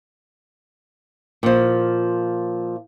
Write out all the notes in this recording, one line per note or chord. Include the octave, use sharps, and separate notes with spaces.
A#2 F3